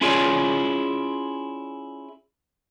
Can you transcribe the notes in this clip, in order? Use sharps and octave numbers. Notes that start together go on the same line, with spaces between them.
C#4 E4 F4 G#4 C#5 D5